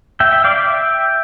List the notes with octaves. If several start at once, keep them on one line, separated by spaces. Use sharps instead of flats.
E5 G5
E5 G5
D5 F5
E5 G5